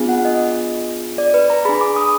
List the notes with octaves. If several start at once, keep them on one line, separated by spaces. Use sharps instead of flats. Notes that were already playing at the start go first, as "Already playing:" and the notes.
Already playing: B3 D4 F4 G#4
F#5
D#5
D5
B4
A#5
D4 G#4 B5
D6
D#6